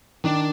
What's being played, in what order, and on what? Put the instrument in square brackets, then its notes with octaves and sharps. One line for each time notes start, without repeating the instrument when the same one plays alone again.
[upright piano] D#3 [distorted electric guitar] D4